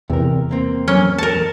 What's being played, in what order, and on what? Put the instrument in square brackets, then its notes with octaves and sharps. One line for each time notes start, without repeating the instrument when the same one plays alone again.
[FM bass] E2 [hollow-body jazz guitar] C3 A#4
[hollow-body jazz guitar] A#3 C4
[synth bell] F#3 F6 G7 [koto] C#4
[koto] A#4 A5 [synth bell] C#7 E7